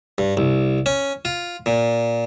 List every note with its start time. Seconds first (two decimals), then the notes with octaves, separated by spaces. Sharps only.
0.18 G2
0.37 C2
0.86 C#4
1.25 F4
1.66 A#2